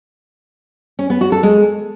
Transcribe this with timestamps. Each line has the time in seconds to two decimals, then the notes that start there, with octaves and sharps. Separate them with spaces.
0.99 C#4
1.10 B3
1.21 F#4
1.32 A4
1.43 G#3